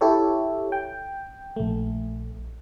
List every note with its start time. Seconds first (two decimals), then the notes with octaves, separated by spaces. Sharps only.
0.01 E4 G4 A4 C#5
0.72 G5
1.56 A#1 A3